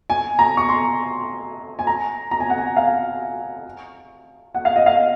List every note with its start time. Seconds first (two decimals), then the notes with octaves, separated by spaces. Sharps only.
0.10 G#5
0.39 A#5
0.57 C#6
0.69 C6
1.79 G#5
1.87 A#5
2.31 A#5
2.40 G#5
2.50 F#5
2.58 G#5
2.76 F5
4.54 F#5
4.65 F5
4.76 D#5
4.86 F5